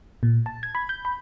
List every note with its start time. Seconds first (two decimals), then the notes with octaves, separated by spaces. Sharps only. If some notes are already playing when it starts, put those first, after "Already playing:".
0.23 A#2
0.46 A5
0.63 G#6
0.75 B5
0.89 G6
1.05 B5